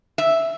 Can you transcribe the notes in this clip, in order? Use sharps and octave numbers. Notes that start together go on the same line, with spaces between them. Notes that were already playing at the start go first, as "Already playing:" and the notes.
E5